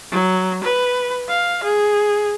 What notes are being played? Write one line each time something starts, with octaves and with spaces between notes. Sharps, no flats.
F#3
B4
F5
G#4